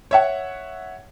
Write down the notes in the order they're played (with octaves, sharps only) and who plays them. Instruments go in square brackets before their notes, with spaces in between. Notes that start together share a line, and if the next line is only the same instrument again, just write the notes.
[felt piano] C#5 E5 F#5